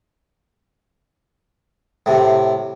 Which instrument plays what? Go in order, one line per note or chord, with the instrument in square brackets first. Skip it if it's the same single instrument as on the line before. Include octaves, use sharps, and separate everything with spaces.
[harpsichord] A2 C3